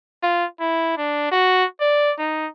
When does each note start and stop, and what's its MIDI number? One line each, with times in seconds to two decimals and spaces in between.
0.23 0.45 65
0.60 0.94 64
0.98 1.31 62
1.31 1.65 66
1.81 2.13 74
2.18 2.48 63